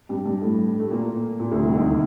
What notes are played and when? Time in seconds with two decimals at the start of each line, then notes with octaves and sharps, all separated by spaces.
0.09 G2 G3
0.25 G2 G3
0.42 A2 A3
0.79 A3
0.91 A#2 A#3
1.39 A#2 A#3
1.51 D2 D3
1.63 C2 C3
1.75 D#2 D#3